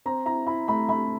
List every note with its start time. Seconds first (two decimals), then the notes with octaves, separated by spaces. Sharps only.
0.06 C4 A#5
0.26 E4 A#5
0.46 E4 B5
0.68 A3 B5
0.89 A3 B5